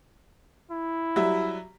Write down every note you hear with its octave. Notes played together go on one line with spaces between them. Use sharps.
E4
F#3 G3 E5